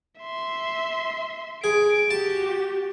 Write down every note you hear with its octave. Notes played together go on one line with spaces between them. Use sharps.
E5 C6
G#4 D7
F#4 G4 A5